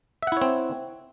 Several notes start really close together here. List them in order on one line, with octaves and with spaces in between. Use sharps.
E5 F#5 E4 C#5 C4